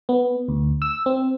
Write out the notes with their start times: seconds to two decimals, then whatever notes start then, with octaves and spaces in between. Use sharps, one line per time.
0.09 B3
0.48 D2
0.82 E6
1.06 C4